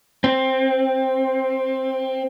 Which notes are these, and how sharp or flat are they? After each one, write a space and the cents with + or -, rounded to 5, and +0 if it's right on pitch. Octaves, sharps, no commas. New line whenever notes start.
C4 +10